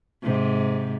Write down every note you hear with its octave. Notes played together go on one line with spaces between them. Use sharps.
G#2 C3